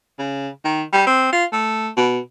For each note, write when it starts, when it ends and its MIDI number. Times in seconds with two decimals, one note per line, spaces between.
0.19 0.49 49
0.65 0.83 51
0.93 1.03 55
1.07 1.33 60
1.33 1.45 65
1.53 1.89 57
1.97 2.18 47